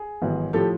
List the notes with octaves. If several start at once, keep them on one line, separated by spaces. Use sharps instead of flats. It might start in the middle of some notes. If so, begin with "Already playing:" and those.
Already playing: G#4
A1 G#2 D#3 F#3 B3
A2 F3 G4 A4